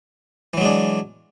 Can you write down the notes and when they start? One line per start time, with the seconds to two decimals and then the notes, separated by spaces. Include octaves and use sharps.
0.54 E3
0.57 F#3
0.61 G#3
0.65 D4